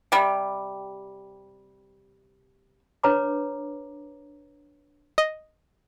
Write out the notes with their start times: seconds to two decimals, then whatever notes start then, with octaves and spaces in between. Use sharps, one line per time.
0.12 C3 G3
3.03 D4 B4 C#5 A#5 D6
5.18 D#5